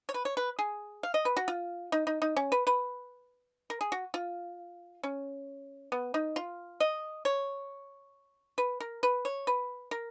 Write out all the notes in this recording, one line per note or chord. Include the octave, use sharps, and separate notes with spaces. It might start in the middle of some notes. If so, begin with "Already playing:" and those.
C#5
B4
C#5
B4
G#4
F5
D#5
B4
F#4
F4
D#4
D#4
D#4
C#4
B4
B4
A#4
G#4
F#4
F4
C#4
B3
D#4
F4
D#5
C#5
B4
A#4
B4
C#5
B4
A#4